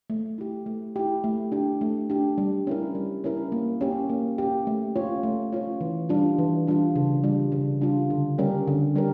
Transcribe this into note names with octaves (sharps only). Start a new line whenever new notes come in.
A3
E4 G4
A3
E4 G4
A3
D4 G4
A3
D4 G4
G3
C#4 E4 A#4
G3
C#4 E4 A#4
A#3
C#4 G4
A#3
C#4 G4
A3
C#4 F4 C#5
A3
C#4 F4 C#5
E3
G3 D4 F4
E3
G3 D4 F4
C#3
G3 D4 F4
C#3
G3 D4 F4
D3
G3 C#4 G4 A#4
D3
G3 C#4 G4 A#4